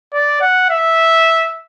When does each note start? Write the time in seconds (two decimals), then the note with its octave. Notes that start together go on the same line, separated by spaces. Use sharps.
0.13 D5
0.41 F#5
0.70 E5